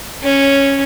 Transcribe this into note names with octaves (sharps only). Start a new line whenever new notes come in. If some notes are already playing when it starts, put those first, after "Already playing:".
C#4 C#5